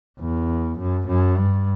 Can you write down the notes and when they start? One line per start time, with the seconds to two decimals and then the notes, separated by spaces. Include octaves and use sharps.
0.20 E2
0.79 F#2
1.08 F#2
1.37 G2